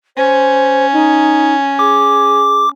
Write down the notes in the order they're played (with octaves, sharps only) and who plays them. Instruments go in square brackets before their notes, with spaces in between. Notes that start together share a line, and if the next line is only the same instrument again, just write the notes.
[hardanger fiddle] C#4 [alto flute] C5
[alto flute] D#4
[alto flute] G#4 [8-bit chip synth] D6